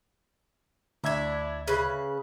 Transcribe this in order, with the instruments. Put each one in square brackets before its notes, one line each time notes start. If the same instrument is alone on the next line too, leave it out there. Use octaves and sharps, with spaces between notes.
[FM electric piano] D2 E5 G#6 [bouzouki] D4 E4
[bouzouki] C#3 B4